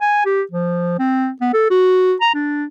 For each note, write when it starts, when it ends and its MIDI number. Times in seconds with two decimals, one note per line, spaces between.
0.01 0.24 80
0.25 0.42 67
0.51 0.98 53
0.99 1.30 60
1.41 1.49 59
1.54 1.67 69
1.70 2.14 66
2.21 2.29 82
2.34 2.65 62